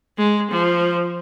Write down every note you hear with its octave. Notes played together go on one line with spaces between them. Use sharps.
G#3
F3